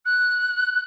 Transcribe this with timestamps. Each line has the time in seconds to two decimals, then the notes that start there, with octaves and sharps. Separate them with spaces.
0.05 F#6